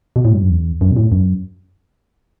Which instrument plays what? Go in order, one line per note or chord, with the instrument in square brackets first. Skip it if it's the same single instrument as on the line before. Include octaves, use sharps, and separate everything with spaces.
[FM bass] B2
A2
G2
F#2
E2
F#2
B2
A2
F#2